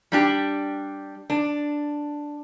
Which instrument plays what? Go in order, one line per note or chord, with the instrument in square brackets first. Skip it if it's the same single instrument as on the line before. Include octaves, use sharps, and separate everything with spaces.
[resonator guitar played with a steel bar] G3 D4 G4
D4